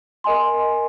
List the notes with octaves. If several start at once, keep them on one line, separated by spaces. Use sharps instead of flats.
A#4 D#5 G#5 C6